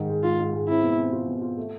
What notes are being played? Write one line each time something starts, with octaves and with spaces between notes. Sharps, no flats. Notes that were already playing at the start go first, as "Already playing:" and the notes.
Already playing: G#2 D#3
G#3
G#2 F4
G#2
G#3
C4 E4
B2
C4
F4
B2
F4
A3